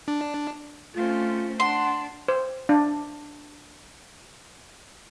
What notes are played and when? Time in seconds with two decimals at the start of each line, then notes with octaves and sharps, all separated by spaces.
0.08 D4
0.95 A3 C4 C#4 F4
1.60 D4 F#5 C6
2.28 C5
2.69 D4